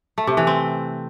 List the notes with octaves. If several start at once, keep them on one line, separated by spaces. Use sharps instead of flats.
A3
C3
E3
C4